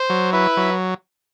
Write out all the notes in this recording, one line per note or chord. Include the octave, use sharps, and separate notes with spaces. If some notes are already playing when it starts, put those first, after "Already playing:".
Already playing: C5
F#3
E4 B4
F#3